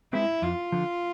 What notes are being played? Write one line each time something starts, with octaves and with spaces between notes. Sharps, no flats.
G#3 C4 E4 G#4 B4
F2 F4
D3 F3